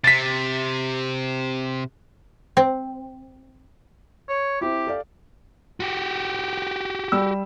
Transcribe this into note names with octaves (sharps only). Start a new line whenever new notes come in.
C3 A6 B6
C4
C#5
C4 E4 G4
A4 D5 F5
F#4 G4
G3 E6